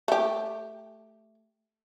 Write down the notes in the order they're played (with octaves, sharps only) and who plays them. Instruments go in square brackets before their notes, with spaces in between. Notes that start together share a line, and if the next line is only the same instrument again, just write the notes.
[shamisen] A3 G4